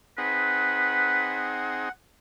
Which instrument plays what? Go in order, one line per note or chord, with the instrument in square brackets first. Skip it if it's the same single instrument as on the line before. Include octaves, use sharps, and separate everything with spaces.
[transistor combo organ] C4 D#4 G#4 [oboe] B4 [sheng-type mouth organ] F#5